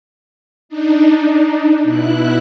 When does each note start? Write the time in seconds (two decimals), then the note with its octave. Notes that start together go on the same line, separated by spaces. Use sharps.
0.69 D4 D#4
1.83 B2 E4 F#6